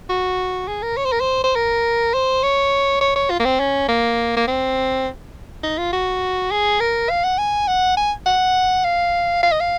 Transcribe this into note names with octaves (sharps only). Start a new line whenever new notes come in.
F#4
G#4
A#4
C#5
C5
A#4
C5
C5
A#4
C5
C#5
C#5
C#5
F4
A#3
C4
C#4
A#3
A#3
C4
D#4
F4
F#4
G#4
A#4
F5
F#5
G#5
F#5
G#5
F#5
F5
F5
D#5
F5